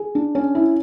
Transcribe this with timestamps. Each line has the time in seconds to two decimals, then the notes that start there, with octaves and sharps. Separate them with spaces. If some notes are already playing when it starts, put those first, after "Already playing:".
Already playing: G#4
0.15 D4
0.35 C#4
0.55 E4